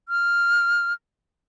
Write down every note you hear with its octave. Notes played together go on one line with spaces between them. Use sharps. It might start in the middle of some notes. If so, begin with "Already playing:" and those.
F6